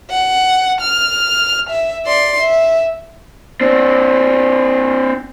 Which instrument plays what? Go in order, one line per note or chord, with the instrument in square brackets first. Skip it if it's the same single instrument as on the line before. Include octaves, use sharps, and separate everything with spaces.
[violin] F#5
F6
E5
D5 C6
E5
[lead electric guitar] C4 D4